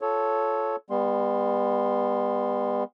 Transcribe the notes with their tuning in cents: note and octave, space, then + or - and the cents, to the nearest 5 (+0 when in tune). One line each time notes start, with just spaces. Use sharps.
F4 -5 A4 -10 C#5 +0
G3 +40 B3 +0 C6 +0